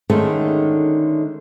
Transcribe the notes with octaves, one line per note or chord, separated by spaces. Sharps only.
D3 D#3 G#3 A3 C#4 D#4